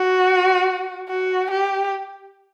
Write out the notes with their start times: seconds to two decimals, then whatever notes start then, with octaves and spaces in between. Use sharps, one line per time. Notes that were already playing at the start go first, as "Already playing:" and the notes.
Already playing: F#4
1.09 F#4
1.51 G4